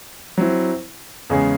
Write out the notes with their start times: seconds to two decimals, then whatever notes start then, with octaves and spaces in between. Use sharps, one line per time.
0.38 F#3 C4 E4
1.30 E2 C#3 G#3 C#4 G#4